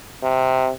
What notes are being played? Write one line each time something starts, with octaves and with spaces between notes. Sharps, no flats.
C3